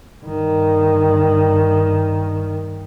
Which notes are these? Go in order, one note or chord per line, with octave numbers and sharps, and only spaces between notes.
G2 D#3